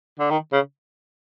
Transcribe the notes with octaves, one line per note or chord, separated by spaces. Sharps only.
D3
D#3
C#3